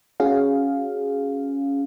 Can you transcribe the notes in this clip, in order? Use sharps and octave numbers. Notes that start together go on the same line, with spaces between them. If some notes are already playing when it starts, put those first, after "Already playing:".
C#4 F#4 G#4 F5